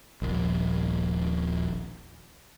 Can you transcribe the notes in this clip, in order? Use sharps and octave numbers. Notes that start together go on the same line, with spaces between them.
D#1 A#1